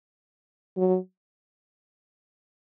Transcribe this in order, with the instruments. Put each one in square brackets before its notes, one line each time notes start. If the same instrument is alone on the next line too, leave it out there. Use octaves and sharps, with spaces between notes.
[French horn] F#3